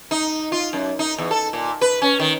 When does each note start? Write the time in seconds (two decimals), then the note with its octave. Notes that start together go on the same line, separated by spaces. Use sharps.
0.11 D#4
0.52 F4
0.73 F#2
0.99 D#4
1.18 E2
1.31 A4
1.53 A#2
1.81 B4
2.02 C#4
2.20 D#3